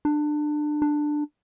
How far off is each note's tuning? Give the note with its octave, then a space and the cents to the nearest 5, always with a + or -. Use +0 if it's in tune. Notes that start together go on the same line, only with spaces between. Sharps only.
D4 +25
D4 +15